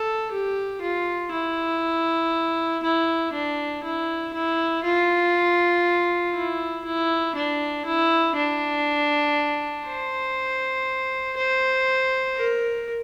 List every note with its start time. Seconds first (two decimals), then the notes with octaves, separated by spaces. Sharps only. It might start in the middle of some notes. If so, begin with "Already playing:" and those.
Already playing: A4
0.32 G4
0.82 F4
1.32 E4
2.83 E4
3.33 D4
3.84 E4
4.33 E4
4.84 F4
6.34 E4
6.85 E4
7.35 D4
7.85 E4
8.36 D4
9.86 C5
11.37 C5
12.37 A#4